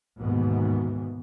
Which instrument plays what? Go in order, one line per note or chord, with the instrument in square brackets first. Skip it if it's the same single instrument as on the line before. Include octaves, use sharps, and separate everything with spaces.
[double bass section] D#2 G#2 B2 E3 B3